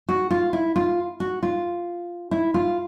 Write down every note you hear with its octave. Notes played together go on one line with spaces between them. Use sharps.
F#4
F4
E4
F4
F#4
F4
E4
F4